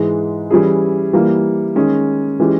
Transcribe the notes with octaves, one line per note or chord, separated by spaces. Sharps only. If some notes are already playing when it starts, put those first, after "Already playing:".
Already playing: G#2 E3 G#3
E3 G3 C#4 E4 G#4
E3 G3 A#3
D#3 G#3 C#4 G#4
E3 G#3 C#4 G4